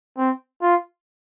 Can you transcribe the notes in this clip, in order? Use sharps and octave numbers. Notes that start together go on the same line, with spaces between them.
C4
F4